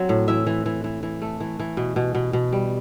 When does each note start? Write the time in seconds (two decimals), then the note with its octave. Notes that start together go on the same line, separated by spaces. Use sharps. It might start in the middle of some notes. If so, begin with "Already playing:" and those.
Already playing: F#3 C4
0.09 A2
0.28 E3 E5
0.47 E3
0.66 E3
0.84 E3
1.03 E3
1.22 A3
1.40 E3
1.60 E3
1.77 B2
1.96 B2
2.15 B2
2.33 B2
2.52 G3